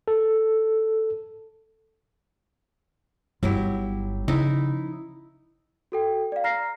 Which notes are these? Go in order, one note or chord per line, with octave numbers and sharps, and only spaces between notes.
A4
G1 F#3 E4 G4
C#3 F3 D#4 E4
F#4 A4 G5
D5 F5
A#5 F6 A#6 C7